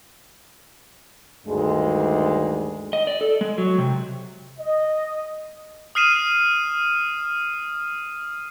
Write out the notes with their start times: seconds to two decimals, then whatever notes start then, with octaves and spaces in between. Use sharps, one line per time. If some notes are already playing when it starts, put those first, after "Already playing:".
1.47 D2 G2 D#3 G#3
2.93 D#5
3.07 D5
3.21 A4
3.41 G#3
3.58 F#3
3.78 C3
4.59 D#5
5.95 D#6 F6 C7 D#7 E7